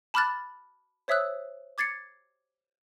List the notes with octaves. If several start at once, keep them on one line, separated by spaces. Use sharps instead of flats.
A5 B5 D6 F6 F#6 A6
C5 C#5 E5 D#6 E6 F#6
D6 G#6 A6 C7 C#7